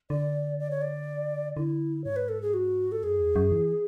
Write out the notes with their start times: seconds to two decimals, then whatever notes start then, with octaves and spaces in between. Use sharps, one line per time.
0.10 D3 D5
0.59 D5
0.71 C#5
0.82 D5
1.57 D3 E4
2.04 G#2 C#5
2.16 B4
2.29 A4
2.42 G#4
2.54 F#4
2.92 A4
3.03 F#2 G#4
3.19 E2
3.36 F#2
3.52 E3